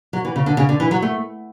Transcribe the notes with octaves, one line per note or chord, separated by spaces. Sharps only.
F#3
E3
C#3
D3
C#3
D3
E3
F#3
A3